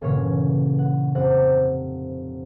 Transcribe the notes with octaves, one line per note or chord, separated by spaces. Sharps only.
G1 A#2 C#3 E3 C#5
F#5
F1 C4 C5 F#5